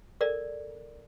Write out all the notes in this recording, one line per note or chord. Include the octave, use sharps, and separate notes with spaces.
A4 A#4 D5